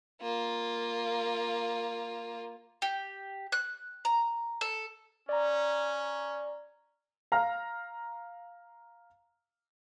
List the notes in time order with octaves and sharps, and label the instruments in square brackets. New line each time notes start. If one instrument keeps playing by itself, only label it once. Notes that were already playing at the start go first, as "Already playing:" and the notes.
[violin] A#3 F4
[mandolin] G4
F#6
A#5
A4
[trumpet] C#4 [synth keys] D5 A#5
[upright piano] F5 A#5 F6